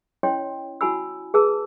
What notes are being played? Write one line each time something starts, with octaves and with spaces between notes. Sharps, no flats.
C#4 E4 C#5 D#5 G5 C6
E4 F#4 G#5 B5 E6
G#4 B4 A5 E6